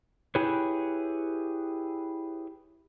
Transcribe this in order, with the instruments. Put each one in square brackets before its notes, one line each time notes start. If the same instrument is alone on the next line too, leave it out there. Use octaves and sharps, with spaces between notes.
[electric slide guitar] E4 G4 G#4 B4 C#5